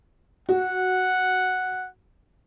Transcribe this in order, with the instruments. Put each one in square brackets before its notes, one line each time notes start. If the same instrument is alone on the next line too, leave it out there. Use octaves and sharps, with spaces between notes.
[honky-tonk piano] F#4 [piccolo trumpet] F#5